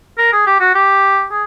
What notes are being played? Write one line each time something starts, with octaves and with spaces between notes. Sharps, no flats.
A#4
G#4
G4
F#4
G4
G#4